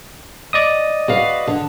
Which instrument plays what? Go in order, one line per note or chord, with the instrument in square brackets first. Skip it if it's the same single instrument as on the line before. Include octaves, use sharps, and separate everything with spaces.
[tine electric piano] D5 D#5 D#6
[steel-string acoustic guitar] F#4 B4 F5
D3